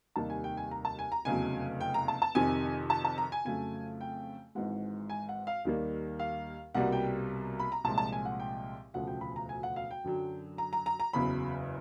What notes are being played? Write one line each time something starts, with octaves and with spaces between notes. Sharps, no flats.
F1 D#2 D#3 G3 A#3 A5
G#5
G5
G#5
A#5
A5
G#5
A#5
F1 E2 C#3 F#3 A3 G#5
G5
A#5
A5
A5
F2 C3 D#3 G#5
A5
A5
A#5
G#5
F2 C#3 F#3 A3 G#5
G5
G#1 G#2 E3 G#3 F#5
G#5
F#5
F5
D#2 D#3 G3 A#3
F5
C2 B2 G3 A#3 F#5
G5
B5
A#5
C2 A#2 F3 G#3 A5
A5
G#5
F#5
G5
E1 D2 C#3 F3 A3 F#5
G5
B5
A#5
G#5
F#5
F5
G5
F#2 D3 F#3
A#5
A#5
A#5
A#5
F#1 E2 C#3 F#3 B5